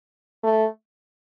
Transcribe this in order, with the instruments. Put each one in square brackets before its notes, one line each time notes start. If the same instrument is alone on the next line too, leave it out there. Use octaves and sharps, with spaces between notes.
[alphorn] A3